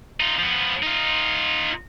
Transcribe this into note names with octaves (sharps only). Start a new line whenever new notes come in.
D#4 F4
F3 B3
D#4 F4